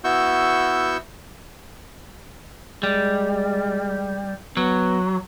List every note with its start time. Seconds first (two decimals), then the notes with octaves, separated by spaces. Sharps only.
0.04 B3 E4 F#4 C#6 E6 G6
2.83 G3 G#3
4.57 F#3 B3